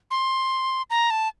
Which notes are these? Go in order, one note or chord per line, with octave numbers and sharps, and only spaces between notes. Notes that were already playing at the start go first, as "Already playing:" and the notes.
C6
A#5
A5